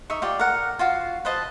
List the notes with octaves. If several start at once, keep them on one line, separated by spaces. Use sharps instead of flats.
D#4 E5 C#6
F4 G4 D5
A#4 F#5
F4 F#4 F5
B4 C5 D#5 A5